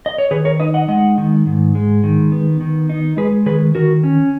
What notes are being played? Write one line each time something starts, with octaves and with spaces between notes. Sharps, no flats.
D#5
C#5
D#3 G#4 B4
A#4 C#5
D#4 B4 D#5
D#5 F#5
G#3 D#5 F#5
D#3
G#2
G#3
D#3
B3
D#3
D#4
G#3 G#4 B4
D#3 G#4 B4
D#3 F#4 A#4
C#4